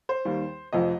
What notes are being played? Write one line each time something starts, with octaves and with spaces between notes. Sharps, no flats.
C5
D#2 D#3 G3
F1 F2 F3 D#5